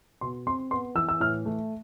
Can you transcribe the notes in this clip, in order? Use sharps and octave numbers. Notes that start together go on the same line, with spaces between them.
B2 C6
C4 C6
B3 C6
E3 E6
E6
A2 F6
A3